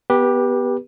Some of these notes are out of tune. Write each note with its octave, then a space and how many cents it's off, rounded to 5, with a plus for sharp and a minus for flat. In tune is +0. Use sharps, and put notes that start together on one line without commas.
B3 +0 G4 +10 B4 -25